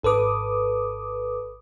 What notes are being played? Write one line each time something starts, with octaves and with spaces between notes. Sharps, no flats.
G#1 A4 B4 D6 D#6